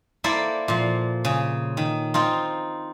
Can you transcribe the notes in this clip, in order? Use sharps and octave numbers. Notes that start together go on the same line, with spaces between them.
A#3 E4 A4 C5 D5
A#2 F3
C#3
D#3
C4 D#4 F4